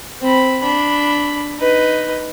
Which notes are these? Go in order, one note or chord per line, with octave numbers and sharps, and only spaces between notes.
C4 B5
D4 B5
D#4 B4